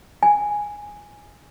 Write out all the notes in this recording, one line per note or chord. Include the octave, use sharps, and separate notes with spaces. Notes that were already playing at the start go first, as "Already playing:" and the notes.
G#5